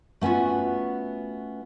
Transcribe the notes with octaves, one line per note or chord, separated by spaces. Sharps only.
A3 B3 C#4 F4 F#4